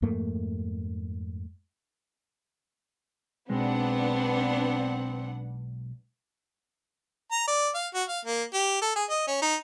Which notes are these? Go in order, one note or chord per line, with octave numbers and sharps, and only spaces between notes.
F2 G#2 A3 A#3
B1 G#3 B3 C4 D4 F#5
A#5
D5
F5
F#4
F5
A#3
G4
A4
G#4
D#5
C#4
D#4